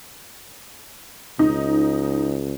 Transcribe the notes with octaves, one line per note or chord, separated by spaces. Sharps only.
C#2 D#4